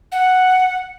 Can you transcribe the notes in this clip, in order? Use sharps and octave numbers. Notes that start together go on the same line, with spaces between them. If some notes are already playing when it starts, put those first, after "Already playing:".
F#5